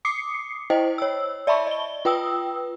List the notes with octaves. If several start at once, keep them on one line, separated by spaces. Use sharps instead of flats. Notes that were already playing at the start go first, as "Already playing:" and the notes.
D6 D#6 C7 C#7
E4 C5 D#5 G5
C#5 E6
D5 E5 A5 B5 C#6
D#5 G7
F4 B4 G5 D#6 E6